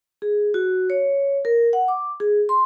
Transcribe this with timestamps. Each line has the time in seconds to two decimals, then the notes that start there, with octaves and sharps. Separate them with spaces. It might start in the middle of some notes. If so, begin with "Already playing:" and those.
0.22 G#4
0.54 F#4
0.90 C#5
1.45 A#4
1.73 F#5
1.88 D6
2.20 G#4
2.49 C6